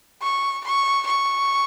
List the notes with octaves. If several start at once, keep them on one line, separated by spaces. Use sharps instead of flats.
C#6
C#6
C#6